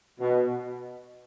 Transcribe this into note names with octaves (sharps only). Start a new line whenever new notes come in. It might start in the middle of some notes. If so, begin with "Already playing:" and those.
B2